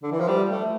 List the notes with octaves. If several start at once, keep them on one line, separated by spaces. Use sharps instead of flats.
D3
E3
F3
G3
A3